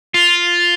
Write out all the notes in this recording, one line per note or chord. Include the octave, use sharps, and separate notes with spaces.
F4